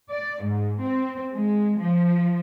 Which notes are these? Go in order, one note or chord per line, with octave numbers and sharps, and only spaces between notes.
D5
G#2
C4
G#3
F3